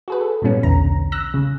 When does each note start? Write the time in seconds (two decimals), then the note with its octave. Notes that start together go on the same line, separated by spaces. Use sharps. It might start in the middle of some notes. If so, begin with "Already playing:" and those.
0.08 F#4 G#4 B4
0.21 A4
0.42 G2 A#2 E3 G3 B3 C#4
0.63 B1 E2 D3 A#5
1.12 E6 F#6 A#6
1.34 C#3